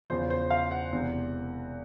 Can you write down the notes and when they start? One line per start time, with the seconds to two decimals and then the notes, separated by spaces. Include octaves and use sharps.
0.10 E2 C#3 F3 C5
0.30 C5
0.50 F5
0.71 F#5
0.92 E1 E2 C3